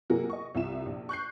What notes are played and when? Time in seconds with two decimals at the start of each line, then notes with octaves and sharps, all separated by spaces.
0.10 C3 F#3 A#3 F#4 G#4 A#4
0.30 D#5 C#6
0.55 C2 C3 F4 E5 E7
0.86 A#1
1.09 C#6 F#6 G6 C7